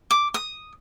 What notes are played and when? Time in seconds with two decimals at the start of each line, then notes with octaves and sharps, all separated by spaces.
0.11 D6
0.34 D#6